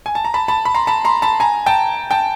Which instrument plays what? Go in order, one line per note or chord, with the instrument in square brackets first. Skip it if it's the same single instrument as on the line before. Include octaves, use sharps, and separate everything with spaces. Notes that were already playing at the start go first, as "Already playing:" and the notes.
[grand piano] G#5
A5
A#5
A5 B5
A5 B5
B5
A#5 C6
A5 B5
A#5 C6
A5 B5
G#5 A#5
G5 A5
G5 A5